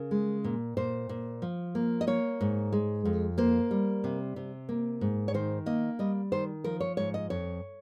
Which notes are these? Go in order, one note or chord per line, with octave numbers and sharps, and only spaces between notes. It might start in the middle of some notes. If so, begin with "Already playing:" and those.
Already playing: C#3 A#4
G#3
A#2
A#2 C5
A#2
F3
A#3
D#5
A#3 C#5
G#2
G#3
F2
A#3 C5
G3
C3
C3
A#3
G#2
C#5
D#3 C5
A#3 D#5
G3 D#5
D#3 C5
F3 A#4
C#5
G#2 C#5
D#5
F2 C#5